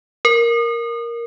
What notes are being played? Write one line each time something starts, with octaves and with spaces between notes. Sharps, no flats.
A#4